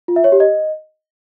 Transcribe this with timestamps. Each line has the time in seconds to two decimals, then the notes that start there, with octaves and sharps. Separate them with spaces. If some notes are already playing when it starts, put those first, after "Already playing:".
0.08 F4
0.16 E5
0.24 C#5
0.32 G4
0.40 D#5